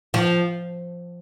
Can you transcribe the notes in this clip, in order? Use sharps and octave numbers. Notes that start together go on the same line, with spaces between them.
F3